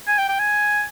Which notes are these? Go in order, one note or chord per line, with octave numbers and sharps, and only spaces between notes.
G#5
G5
G5
G#5